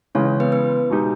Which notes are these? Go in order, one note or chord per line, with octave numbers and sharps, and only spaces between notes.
C#3 E3 G#3 C#4 C#5
B3 B4
B3 B4
B2 G#3 D#4 G4